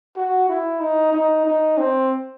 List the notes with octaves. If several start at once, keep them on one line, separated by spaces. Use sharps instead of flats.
F#4
E4
D#4
D#4
D#4
C4